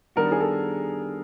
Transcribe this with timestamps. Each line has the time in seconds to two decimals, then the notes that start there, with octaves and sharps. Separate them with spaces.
0.16 D#3 G3 B3 D4 F#4 A#4
0.32 G#4
0.41 A4